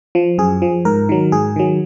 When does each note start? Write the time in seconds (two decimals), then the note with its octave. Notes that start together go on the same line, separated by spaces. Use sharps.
0.15 F3
0.38 F#2 G#4
0.62 F3
0.85 G#2 A#4
1.09 D#3 F#3
1.32 G#2 G#4
1.56 D#3 F#3